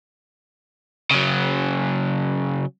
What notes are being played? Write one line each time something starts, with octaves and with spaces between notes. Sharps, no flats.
C#3 F#3